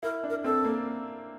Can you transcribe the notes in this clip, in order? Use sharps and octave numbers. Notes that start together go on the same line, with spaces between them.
E4 A#4
D4
A#4
C4 A4
A#3